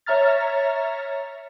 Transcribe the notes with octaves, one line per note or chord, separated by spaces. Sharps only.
C#5 E5 A#5 F6 A6